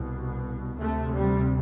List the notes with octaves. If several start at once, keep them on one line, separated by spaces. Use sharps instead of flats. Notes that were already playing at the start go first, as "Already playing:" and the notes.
Already playing: C2 B2
D2 C3 A3
G3